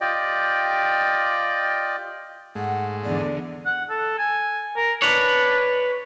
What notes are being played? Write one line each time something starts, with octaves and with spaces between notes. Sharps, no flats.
F4 G4 D5 D#5 G5
G#2 G#3 A3 F#5
E2 D3 D5
F#5
A4
G#5
A#4
D4 B4 C#5